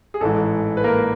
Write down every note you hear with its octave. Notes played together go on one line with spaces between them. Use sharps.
G#4
A1 G#2 E3 A3 A4
B4
A#3 A#4